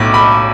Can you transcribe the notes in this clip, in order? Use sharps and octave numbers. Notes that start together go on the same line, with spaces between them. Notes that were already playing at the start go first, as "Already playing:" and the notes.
Already playing: B1 A2 A3 D6
B5